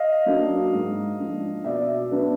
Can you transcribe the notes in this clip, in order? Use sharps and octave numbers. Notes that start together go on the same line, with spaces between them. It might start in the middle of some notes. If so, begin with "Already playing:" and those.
Already playing: D#5 F5
F#3 A#3 D4
G#2
F3 A#3 D4
B2 D5 E5
F#3 B3 D4